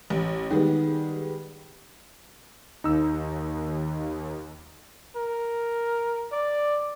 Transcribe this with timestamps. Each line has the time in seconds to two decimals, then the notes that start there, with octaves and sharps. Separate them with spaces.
0.10 A1
0.51 D#3 G3 G#3 B3
2.84 D#2 D#4 E6
5.16 A#4
6.32 D5